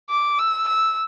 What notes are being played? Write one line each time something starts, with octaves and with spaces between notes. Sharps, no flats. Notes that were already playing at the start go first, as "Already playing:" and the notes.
D6
E6
E6